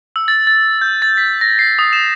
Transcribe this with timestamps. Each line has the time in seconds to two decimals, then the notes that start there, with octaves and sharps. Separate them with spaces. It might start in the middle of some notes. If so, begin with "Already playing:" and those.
0.16 E6
0.28 A6
0.47 A6
0.81 G6
1.02 A6
1.17 B6
1.41 A#6
1.59 C7
1.79 D#6
1.93 E7